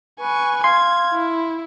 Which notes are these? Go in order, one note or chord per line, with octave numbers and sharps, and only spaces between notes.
B4 G#5 C#6
F5 C6 G#6
E4